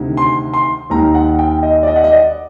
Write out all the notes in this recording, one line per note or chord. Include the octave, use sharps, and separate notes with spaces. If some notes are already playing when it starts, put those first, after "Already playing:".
Already playing: D2 C3 D#3
C6
C6
D#2 D#3 A#5
F#5
G5
D#5
D5
D#5
F#5
D#5
D5